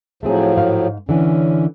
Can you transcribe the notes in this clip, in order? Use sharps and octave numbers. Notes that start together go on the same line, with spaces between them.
A2 F3 F#3 A3 C4 G#4
G#2 F5
D3 E3 C#4